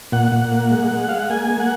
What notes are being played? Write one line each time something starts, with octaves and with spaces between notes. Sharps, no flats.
A#2 F#5
A#2
A#3
G#3
G#3
G#3 F5
F#5
A#3 G#5
A#3
F#5